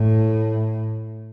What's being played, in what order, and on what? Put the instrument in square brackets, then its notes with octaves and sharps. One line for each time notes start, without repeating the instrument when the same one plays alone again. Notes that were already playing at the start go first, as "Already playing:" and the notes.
Already playing: [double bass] A2